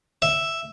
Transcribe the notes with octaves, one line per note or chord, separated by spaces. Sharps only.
E5